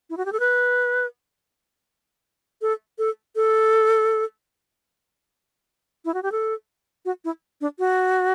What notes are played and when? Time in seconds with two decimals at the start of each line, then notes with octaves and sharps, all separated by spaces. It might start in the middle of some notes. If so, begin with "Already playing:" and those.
0.10 E4
0.17 F#4
0.25 G4
0.32 A4
0.40 B4
2.62 A4
2.98 A4
3.36 A4
6.05 E4
6.14 F#4
6.23 G4
6.32 A4
7.05 F#4
7.25 E4
7.61 D4
7.79 F#4